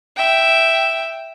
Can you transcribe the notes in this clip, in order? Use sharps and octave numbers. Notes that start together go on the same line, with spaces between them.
E5 G5